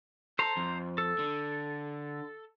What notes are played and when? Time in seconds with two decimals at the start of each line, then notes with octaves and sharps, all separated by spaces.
0.39 A4 C5 A#5
0.57 F2
0.98 A4
1.19 D3